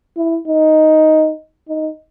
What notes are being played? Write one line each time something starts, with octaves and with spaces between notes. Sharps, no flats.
E4
D#4
D#4